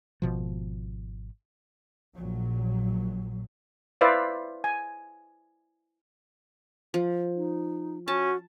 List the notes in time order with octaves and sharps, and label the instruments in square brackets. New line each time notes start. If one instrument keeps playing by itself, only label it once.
[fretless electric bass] G#1 B2 F3
[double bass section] A#1 A#2 F#3
[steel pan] E4 B4 C5 D5 E5 F5
G#5
[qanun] F3
[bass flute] D#4
[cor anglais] C#4 [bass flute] F#4 [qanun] A5